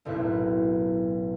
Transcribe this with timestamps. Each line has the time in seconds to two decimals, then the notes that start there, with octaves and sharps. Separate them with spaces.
0.05 F#1 B1 A2 C4 E4 F#6